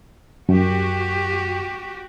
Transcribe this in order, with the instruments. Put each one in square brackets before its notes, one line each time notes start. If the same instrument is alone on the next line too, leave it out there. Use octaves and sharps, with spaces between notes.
[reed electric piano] F#2 [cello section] F#4 G4